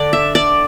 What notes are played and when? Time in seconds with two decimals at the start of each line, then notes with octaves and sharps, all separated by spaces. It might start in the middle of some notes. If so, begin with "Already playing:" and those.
Already playing: D3 D5
0.13 E5
0.35 D5